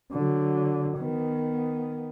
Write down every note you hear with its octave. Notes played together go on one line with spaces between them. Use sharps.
D3 F#3
D#3 B3